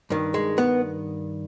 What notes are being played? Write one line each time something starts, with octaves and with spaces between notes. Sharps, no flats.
G2 D#3
G#3
B3